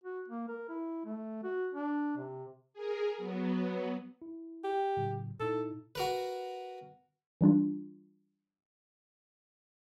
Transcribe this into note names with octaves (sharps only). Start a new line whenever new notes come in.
F#4
A#3
A#4
E4
A3
F#4
D4
C3
G#4 A#4
F#3 B3
E4
G4
A2 C#3 F#3
A#2 D#4 E4 A4
F#4 A#4 B4
E3 G3 D4 F4